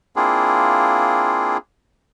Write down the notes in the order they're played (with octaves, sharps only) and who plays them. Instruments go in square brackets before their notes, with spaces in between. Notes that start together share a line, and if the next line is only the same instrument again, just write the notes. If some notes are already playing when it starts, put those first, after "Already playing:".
[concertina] A#3 C4 D4 E4 F4 G#4